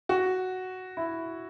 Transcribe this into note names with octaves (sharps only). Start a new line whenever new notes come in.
F#4
E4